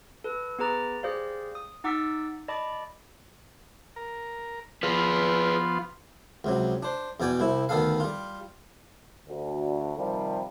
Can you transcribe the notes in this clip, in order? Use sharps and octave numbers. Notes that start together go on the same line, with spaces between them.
A4 B4
B3 G#4 B4 A#5 D6 A6
G4 G#4 C5 D5 F5
D#6
D#4 F#5 D6 E6 A6 B6
D5 D#5 A5 B5 D6
A#4
F3 B3 F4 G#4 B4
C#2 C3 F#3
D4 C5
E2 B2 D5 G5 G#5
C2 C3 E4
D2 D#3 B3 A4 F5
G3 F4
D2
C3 D#3 F3 G3